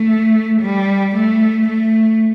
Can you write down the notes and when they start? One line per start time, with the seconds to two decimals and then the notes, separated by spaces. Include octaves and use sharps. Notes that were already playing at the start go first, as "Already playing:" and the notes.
Already playing: A3
0.62 G3
1.15 A3
1.68 A3